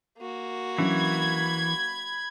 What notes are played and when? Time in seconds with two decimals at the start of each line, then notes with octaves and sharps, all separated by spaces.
0.19 A#3 F#4
0.78 E3 F#3 C#4 D4 B5 G#6